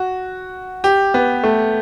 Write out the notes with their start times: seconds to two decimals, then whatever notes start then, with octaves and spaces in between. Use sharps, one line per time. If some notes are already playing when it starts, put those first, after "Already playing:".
Already playing: F#4
0.84 G4
1.14 B3
1.44 A3